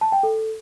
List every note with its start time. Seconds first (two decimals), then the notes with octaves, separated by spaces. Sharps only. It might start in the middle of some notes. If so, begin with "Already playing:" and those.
0.01 A5
0.12 G5
0.23 A4